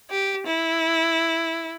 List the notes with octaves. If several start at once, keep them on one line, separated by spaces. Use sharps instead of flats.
G4
E4